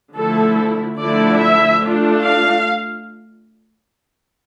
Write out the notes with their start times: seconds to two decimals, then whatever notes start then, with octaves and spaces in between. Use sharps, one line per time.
0.15 D3 F3 A3 E4 A4
0.99 D3 F3 A3 E4 D5
1.40 E5
1.83 A3 D4 F4
2.24 F5